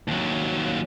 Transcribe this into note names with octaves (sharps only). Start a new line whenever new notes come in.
D#2 F#3